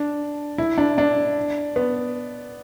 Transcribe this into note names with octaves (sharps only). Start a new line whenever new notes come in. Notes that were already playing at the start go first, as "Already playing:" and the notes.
Already playing: D4
E4
D4
D4
B3